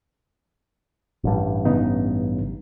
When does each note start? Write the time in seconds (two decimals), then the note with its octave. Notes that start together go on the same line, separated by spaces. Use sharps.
1.24 A1 G2
1.65 C#3 B3 D#4